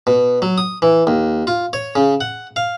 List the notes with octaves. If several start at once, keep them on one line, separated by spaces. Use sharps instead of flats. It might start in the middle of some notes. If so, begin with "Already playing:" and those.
B2
F#3
D#6
E3
D#2
F4
C#5
C#3
F#5
F5